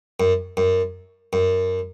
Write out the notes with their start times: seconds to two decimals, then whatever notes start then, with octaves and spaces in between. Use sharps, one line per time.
0.20 F#2
0.57 F#2
1.33 F#2